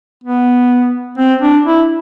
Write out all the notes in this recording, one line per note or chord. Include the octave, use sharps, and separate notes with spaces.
B3
C4
D4
E4